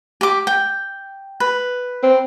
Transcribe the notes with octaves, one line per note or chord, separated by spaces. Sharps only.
G4 D6
G5
B4
C4